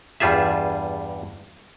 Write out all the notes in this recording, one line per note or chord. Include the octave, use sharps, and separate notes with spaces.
E2 G2 G3 F4 G#4 E5